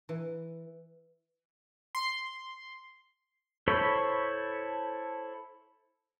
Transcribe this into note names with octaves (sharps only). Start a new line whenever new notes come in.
E3
C6
E4 A4 C5 C#5 B5